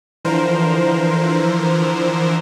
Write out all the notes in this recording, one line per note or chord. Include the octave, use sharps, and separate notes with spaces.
D3 E3 F3 A#4 C5